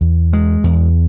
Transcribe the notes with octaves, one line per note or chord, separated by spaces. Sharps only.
E2
G#3
E2